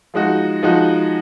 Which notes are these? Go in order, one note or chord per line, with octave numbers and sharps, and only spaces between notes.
F3 G#3 D#4 F#4
F3 G#3 D#4 F#4